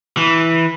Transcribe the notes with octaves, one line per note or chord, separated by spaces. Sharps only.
E3